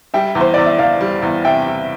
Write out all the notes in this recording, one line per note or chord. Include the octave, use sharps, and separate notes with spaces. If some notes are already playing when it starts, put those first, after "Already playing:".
G3 E5 G5
E2
C5
E2 D5
E5
E2 D5 F5
G3
E2
C3 E5 G5
G3